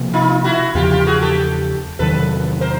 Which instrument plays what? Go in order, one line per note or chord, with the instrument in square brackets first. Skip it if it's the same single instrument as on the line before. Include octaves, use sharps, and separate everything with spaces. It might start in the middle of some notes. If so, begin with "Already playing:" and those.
Already playing: [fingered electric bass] C3 F3 A#3
[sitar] D#4 F4
E4 F#4
[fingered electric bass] E2 C#3 F3 [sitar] F4 G4
[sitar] F4 G4
F#4 G#4
G4 A4
[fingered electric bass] E2 C3 D#3 F#3 [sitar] A4 B4
[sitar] A#4 C5